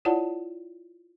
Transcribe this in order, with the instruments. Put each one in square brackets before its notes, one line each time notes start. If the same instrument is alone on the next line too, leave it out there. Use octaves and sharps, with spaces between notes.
[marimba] E4 F4 C#5 D5 F#5 A5